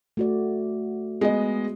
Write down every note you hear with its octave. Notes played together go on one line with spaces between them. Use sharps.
A3 F#4 D5
G#3 B3 D#5